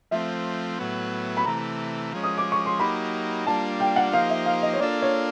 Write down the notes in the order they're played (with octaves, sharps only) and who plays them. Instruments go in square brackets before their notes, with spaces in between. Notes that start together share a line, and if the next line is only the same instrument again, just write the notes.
[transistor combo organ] F3 A3 C4 [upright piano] E5
[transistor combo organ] A2 F#3 B3
[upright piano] B5
[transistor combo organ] C3 E3 A3 [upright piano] A#5
[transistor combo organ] F3 G#3 C#4
[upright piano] D#6
D6
C#6
C6
[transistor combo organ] F#3 A#3 D#4 G4 [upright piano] B5
[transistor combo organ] G3 A#3 D4 F4 [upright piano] A5
[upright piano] G5
F#5
[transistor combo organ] F3 A#3 D#4 G4 C5 [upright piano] F5
[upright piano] E5
F5
D#5
C#5
[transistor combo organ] A#3 D4 F4 A4 [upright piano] D5
[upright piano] C#5